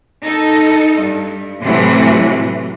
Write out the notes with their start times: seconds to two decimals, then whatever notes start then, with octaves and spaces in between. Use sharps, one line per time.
0.23 D#4 A4
0.98 G2
1.62 A2 C3 E3 F#3 A3